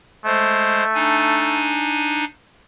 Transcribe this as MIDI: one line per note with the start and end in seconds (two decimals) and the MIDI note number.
0.25 0.84 56
0.25 1.76 57
0.25 0.84 72
0.94 2.25 62
0.94 2.25 63
0.94 2.25 80